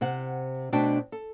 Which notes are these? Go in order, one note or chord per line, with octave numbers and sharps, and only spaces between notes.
C3 C5 F#5
B2 A3 D4 F#4 C5 G5
A4